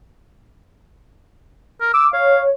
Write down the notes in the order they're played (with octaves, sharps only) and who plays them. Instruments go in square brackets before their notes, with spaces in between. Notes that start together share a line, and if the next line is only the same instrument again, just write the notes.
[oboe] A#4
[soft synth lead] D6 [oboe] E6
[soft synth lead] C#5 [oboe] F5